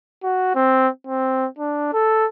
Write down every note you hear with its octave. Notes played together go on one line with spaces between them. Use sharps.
F#4
C4
C4
D4
A4